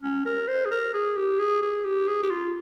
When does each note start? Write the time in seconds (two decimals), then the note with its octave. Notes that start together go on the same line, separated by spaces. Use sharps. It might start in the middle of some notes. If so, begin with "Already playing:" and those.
0.02 C#4
0.25 A#4
0.48 C5
0.65 G#4
0.71 A#4
0.94 G#4
1.17 G4
1.39 G#4
1.62 G#4
1.85 G4
2.08 G#4
2.23 G4
2.31 F4